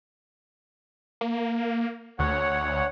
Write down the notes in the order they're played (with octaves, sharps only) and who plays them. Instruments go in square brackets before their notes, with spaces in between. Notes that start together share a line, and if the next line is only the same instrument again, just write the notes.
[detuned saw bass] A#3
[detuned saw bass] D2 [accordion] C#5 F#5